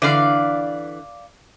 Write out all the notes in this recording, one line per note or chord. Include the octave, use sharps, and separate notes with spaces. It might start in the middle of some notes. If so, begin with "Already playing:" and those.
D3 E3 D5 F5